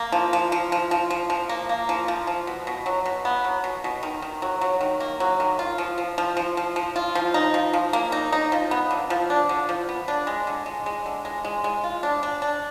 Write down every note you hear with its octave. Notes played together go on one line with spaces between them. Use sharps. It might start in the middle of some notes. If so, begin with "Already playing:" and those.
Already playing: A#3
F3
F3
F3
F3
F3
F3
F3
A#3
A#3
F3
F3
F3
B2
B2
F#3
B2
B3
F#3
B2
B2
D#3
D#3
F#3
F#3
D#3
A#3
F#3
D#3
F4
F3
F3
F3
F3
F3
F3
F4
F3
D#4
F3
F3
A#3
D#4
D#4
F3
B3
D3
F3
D4
D3
F3
B3
D4
G#3
D3
G#3
G#3
D3
G#3
G#3
G#3
F4
D4
D4
D4